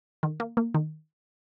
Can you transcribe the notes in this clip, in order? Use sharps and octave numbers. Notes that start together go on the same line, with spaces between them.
D#3
A#3
A#3
D#3